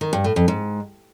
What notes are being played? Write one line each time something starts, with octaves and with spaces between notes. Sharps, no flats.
D#3
G2
A2
F2
G#2